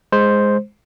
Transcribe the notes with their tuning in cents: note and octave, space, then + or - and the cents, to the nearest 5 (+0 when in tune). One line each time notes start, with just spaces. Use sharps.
G#3 -5 C5 +0